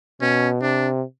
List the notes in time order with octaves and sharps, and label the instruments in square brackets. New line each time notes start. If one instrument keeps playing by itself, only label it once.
[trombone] B2 [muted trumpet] C#4
[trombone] C3 [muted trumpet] D4